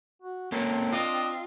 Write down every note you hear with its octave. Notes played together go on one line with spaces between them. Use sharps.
F#4
A#3 C4 C#4 A4
D4 F4 D#5